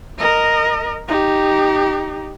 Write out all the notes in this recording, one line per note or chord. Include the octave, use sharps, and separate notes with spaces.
A#4 D#5
D#4 G4